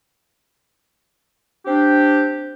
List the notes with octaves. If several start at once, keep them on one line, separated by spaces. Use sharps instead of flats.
C4 D4 G4